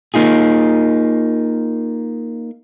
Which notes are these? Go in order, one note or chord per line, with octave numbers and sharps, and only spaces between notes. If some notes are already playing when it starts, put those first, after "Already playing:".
A#3 D#4 F4 G#4